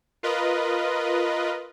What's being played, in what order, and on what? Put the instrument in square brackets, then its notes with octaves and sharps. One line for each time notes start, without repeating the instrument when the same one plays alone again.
[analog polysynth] F4 A#4 B4 D#5